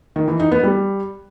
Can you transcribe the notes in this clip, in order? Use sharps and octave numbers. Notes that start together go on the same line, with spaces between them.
D#3
E3
D#4
B3
G3